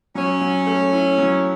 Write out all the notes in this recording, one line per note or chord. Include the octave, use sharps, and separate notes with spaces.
F#3 C#4
F#3
A3
E4
F#3